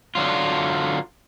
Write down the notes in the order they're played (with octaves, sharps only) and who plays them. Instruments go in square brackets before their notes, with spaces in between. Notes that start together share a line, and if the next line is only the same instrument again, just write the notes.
[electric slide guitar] D3 F#3 F4